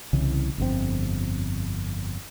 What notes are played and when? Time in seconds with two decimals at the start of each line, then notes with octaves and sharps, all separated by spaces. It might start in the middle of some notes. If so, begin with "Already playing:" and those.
0.13 C2 C#3 E3
0.58 G1 F2 A2 C4